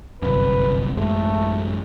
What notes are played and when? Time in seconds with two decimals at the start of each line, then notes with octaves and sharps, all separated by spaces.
0.22 G1 C2 F#2 B4
0.97 A1 F#2 G#3 A3